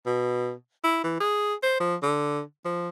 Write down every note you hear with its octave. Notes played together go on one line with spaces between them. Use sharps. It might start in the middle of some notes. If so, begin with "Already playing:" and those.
B2
E4
E3
G#4
C5
F3
D3
F3